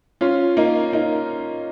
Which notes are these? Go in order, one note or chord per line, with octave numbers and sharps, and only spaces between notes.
C#4 F4
A#3 D#4
A#3 D#4